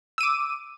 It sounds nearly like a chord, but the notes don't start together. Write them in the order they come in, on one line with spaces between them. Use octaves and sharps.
E6 D#7 D6